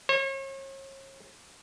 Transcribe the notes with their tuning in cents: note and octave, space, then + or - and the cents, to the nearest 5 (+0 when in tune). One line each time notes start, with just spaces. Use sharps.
C#5 -40